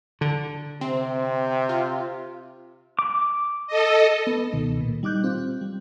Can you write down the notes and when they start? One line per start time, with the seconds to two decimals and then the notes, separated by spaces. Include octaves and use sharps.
0.21 D3
0.81 C3 C4
1.69 F4
2.99 D6
3.67 A4 D#5
4.27 B3
4.52 C#2 B2 D#3
4.81 A#2
5.03 G3 D#4 D6 F#6 G6
5.24 C4 F4
5.61 G3